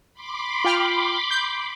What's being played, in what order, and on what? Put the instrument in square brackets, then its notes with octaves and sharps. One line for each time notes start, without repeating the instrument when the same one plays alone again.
[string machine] B5 C6 D6
[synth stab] F4 G5 F6
G6